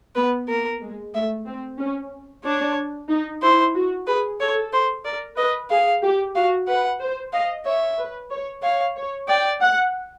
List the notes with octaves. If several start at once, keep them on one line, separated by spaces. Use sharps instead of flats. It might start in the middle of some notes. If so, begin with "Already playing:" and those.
B3 B4
A#3 A#4
G#3
A3 E5
C4
C#4
D4 C#5
D#4
E4 C5
F#4
G#4 B4
A4 C#5
C5
A#4 D5
B4 D#5
G#4 F5
G4
F#4 F5
B4 F#5
C5
D#5 F5
C#5 E5
B4
C#5
C#5 F5
C#5
D5 G5
F#5